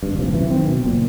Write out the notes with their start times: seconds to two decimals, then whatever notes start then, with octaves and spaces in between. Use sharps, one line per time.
0.03 G#1 G2
0.18 D#1 C3 F3
0.32 F#2 E3
0.50 D#3 C4
0.68 B2
0.85 F#1 A#2